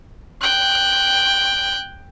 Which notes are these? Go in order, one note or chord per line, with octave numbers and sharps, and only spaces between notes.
G5 F#6